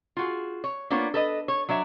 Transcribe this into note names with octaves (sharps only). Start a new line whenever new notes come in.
F4 F#4 G#4
C#5
A#3 B3 D4 F4 C#5
A4 B4 D#5
C#5
F#3 D4 C#5 E5